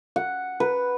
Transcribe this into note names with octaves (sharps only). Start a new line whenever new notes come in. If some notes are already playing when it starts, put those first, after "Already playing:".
F#5
B4